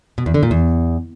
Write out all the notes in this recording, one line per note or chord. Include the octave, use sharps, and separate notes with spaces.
B2
E2
D3
A#2
E2